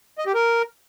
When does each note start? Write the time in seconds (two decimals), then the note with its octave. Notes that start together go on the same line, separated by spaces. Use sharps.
0.18 D#5
0.26 G4
0.34 A#4